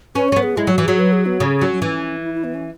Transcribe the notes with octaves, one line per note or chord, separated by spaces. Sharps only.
C#4 B4
C#4 C#5
B3
G#4
G#3 E4
F#3 F#4
E3
F#3 G#4
B4
G#4
B3
C#3 C#4
F#3
E3
E4
E4
B3
C#4